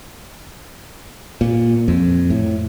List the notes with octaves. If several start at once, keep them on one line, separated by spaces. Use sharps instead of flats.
A#2
F2
A2